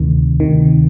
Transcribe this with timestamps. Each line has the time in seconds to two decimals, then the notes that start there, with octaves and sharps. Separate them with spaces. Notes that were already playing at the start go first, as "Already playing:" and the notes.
Already playing: D2 C3 D#3
0.40 D2 C3 D#3